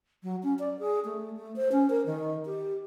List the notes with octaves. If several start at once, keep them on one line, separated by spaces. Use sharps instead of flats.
F#3
C#4
D5
G#4
A3
A3
C5
C#4
A#4
D#3
G4